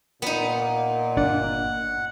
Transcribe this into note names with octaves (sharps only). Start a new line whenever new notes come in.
A#2 B3 D#4
G1 D4 D5 F#5